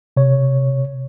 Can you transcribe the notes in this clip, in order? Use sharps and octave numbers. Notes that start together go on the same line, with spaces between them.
C3 C#5